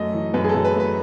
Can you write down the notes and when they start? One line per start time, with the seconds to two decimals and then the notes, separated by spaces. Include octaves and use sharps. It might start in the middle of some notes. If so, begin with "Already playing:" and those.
Already playing: F#2 A3 D#5
0.13 E3
0.34 F#2 B4
0.44 G#4
0.49 A4
0.54 F#2
0.65 B4
0.75 A3 B4